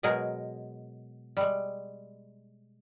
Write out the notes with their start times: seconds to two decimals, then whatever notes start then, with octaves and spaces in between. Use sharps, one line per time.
0.03 B2 F#3 G#3 G#4 A#4
1.37 G3 G#3